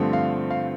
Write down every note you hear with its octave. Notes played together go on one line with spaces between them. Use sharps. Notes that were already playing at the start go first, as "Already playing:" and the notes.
Already playing: G2 D3 F3 A3 C4
F5
F5